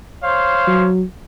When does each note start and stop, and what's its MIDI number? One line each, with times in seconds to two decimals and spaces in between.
0.22 0.87 72
0.22 0.87 73
0.22 0.87 77
0.67 1.03 54